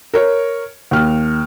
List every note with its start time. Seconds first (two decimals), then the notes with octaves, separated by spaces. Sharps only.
0.14 A#4 C#5
0.91 D#2 F6